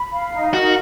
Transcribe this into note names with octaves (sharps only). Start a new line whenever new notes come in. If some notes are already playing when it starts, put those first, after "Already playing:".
Already playing: B5
F5
D#4
F#4 A#4